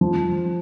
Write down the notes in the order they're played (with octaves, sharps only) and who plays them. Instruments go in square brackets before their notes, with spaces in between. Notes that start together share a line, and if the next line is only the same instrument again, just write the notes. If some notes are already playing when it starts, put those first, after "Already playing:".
[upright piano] F3